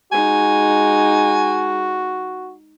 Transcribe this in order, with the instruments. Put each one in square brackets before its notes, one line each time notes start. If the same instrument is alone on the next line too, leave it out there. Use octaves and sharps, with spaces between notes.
[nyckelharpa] G#3 D#4 [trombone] F#4 [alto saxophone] G#5